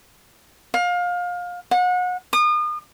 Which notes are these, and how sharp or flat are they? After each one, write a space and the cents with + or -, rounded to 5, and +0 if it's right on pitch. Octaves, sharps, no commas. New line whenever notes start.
F5 +25
F#5 -35
D#6 -35